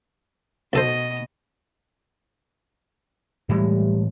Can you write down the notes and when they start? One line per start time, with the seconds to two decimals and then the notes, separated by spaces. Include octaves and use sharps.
0.73 B1 B2 A4 C5 D#5
3.49 A2 E3 G3 G#3